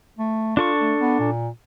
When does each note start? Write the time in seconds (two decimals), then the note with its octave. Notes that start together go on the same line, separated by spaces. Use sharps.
0.19 A3
0.57 D4 F4 A4 C#6
0.80 A3
1.00 B3
1.20 A#2